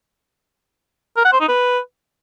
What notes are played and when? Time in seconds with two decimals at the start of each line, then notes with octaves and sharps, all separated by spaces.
1.17 A#4
1.25 F#5
1.33 C5
1.40 D#4
1.48 B4